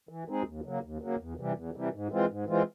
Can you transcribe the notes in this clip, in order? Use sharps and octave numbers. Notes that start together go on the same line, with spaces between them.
E3
G#3 C4 D#4 G#4
D#2
C#3 F#3 A#3
D#2
C#3 F#3 A#3
E2
C3 E3 G3
E2
C3 E3 G3
G#2
E3 G#3 C4 F4
G#2
E3 G#3 C4 F4